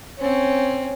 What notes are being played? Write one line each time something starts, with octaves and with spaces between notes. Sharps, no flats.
C4 C#4